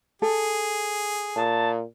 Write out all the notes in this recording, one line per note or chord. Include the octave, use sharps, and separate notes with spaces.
G#4 A4
A#2 A5